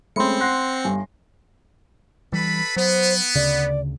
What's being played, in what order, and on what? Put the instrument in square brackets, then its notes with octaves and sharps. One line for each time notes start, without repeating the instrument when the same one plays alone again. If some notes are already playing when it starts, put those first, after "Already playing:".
[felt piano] G#3 A3 C#4 [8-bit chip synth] C4 C#7 [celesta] E5 B5 C6
[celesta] F#5 C6 F#6 [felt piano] A#6 C7
[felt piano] G1 G2 [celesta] G#5
[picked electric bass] E3 G3 [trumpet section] A4 B4 B5
[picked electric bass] F#3 [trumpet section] B3 [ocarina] C5
[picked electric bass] D2 C#3 [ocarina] D5